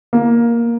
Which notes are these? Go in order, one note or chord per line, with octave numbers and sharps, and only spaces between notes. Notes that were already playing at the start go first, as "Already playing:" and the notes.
A#3